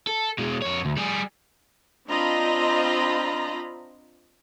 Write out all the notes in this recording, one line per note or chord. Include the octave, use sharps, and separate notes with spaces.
A4
B2 G#3
F2 C#5
D2
G3 G#4
C4 D4 F4 D#5 A#5 B5